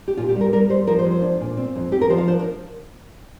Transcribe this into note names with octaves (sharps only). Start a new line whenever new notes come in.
G4
A#2 F4
G4
G3
A#4
G3 A#4
G3 C5
F3 A#4
C5
F2
C5
D4
A#2
C4
F2
F2 G4
A#4
F3 C5
F5
D4 C5
A#4